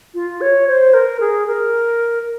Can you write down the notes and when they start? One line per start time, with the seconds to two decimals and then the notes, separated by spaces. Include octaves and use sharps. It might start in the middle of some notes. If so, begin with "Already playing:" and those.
0.14 F4
0.41 C#5
0.67 C5
0.94 A#4
1.20 G#4
1.47 A#4